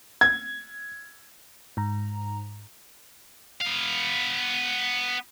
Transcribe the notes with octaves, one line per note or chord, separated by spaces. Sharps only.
G#6
G#2 A#5
B3 F5